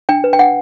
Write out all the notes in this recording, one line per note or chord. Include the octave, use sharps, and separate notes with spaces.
D4 G5
B4
G5
D4 F#5